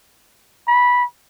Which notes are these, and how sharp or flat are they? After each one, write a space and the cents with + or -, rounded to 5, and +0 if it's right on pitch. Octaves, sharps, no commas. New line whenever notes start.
B5 -10